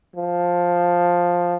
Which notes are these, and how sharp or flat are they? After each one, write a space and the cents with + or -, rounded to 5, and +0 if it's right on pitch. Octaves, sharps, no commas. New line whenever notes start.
F3 +10